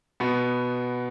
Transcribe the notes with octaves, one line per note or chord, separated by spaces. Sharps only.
B2 B3